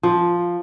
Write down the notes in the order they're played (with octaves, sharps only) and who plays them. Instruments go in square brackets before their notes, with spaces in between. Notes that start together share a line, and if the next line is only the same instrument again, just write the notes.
[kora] F3